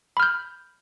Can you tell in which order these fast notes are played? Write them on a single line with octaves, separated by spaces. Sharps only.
B5 F6 G6